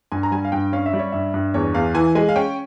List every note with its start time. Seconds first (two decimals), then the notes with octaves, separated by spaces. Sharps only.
0.12 G2 G#5
0.23 A#5
0.31 G3 G#5
0.44 F5
0.52 G2 G5
0.73 C#4 F5
0.86 E5
0.93 G3
0.99 C#5
1.12 G2 E5
1.34 G2
1.54 E2 C#5
1.74 E2 F5
1.94 E3 G#5
2.15 G#3 G#5
2.29 F5
2.36 C#4 G5